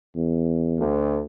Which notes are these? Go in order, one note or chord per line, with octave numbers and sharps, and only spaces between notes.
E2
D2